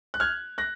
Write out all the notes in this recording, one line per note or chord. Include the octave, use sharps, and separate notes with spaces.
F#6
F6 G#6
F#6 A#6